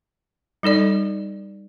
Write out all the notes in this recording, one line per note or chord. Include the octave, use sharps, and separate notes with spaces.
G3 D#4 A4 D5